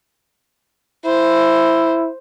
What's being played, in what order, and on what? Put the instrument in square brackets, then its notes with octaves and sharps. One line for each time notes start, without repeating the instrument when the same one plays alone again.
[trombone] E4 [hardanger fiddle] C5